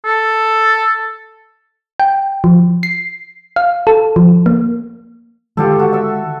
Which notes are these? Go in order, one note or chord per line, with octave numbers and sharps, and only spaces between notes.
A4
G5
F3
C7
F5
A4
F3
A#3
D3 D#3 G#3 F4 G4 A4
F#4 A4
E5 E6